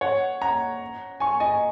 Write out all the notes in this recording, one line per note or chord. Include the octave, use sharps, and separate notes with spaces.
C#5 F#5
F#5 A#5
G#5 C#6
D#5 G#5